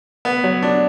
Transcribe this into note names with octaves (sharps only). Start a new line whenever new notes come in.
B3
F#3
D4